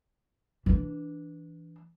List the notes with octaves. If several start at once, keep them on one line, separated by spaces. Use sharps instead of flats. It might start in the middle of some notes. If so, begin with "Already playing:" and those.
E3 D4